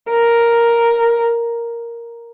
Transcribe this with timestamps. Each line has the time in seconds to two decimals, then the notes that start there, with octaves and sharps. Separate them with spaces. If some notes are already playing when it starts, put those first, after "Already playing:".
0.10 A#4